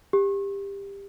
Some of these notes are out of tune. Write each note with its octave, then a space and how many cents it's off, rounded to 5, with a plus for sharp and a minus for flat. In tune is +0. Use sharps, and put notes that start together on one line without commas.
G4 +20